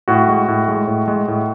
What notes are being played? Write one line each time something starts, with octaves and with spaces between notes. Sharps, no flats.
A2 F#4
G#3
A2
G#3
A2
G#3
A2